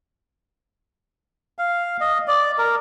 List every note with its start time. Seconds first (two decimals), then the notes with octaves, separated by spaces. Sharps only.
1.58 F5
2.01 D#5
2.28 D5
2.58 A#4